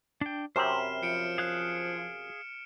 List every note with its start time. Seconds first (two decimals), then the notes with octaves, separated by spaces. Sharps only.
0.21 D4 G5
0.56 F#2 C3 C4 C5 B5 F6 E7
1.03 F3 C#7 D7
1.38 G#4 F5 F#6